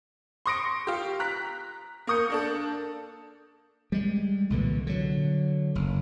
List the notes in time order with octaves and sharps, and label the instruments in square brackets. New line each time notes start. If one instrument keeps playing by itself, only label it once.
[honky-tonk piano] C6 C#6 D#6 A#6 C#7 D7
F4 G4
A#5 F#6 B6
A#3 A#4 D#6 G6 C#7
A#3 D4 A4
[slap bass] G3 G#3
C2 A#2 D3 E3
D3 F#3
F#1